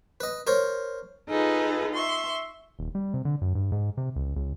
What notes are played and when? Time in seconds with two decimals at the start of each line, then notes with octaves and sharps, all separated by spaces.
0.20 B4 D#5
0.47 A#4 C5 C#5
1.30 D#4 F4 G#4 A4 B4
1.95 E5 C6 C#6
2.79 D#1
2.95 G3
3.14 C3
3.25 D3
3.41 F#2
3.55 G2
3.72 G#2
3.97 C3
4.16 C#2
4.36 C#2